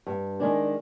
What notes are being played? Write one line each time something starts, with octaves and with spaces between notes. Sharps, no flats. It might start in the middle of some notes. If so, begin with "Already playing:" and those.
G2
D#3 G#3 D4